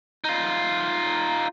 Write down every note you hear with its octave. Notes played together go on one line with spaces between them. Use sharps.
D#4 F4